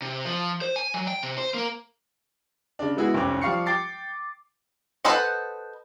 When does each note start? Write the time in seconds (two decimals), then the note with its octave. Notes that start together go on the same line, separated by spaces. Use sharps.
0.02 C3
0.25 F3
0.62 C5
0.76 G#5
0.94 F#3
1.08 G5
1.23 C3
1.38 C5
1.54 A#3
2.79 C#3 D4
2.96 G#3 B3 E4 F#4 G#4
3.14 F1 C2 C4 C#4 D6
3.41 F3 G3 F5 C#6 C7 C#7
3.66 G5 D6 A6 C7
5.05 A4 B4 C5 D#5 F#5